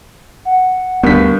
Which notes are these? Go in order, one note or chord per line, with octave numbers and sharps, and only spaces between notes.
F#5
D2 G2 B3 A#4 B6